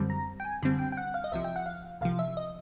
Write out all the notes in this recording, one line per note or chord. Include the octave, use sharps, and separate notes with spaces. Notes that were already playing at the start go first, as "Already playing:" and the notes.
Already playing: F#2 D3 G3 C4
A#5
G5
G#5
F#2 D3 G3 C4
G5
G5
F#5
F5
D#5
C2 C3 F3 E5
G5
F#5
F5
C2 C3 F3 F5
E5
D#5